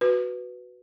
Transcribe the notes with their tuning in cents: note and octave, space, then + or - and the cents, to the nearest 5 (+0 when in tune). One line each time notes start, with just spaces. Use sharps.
F#4 +0 B4 +0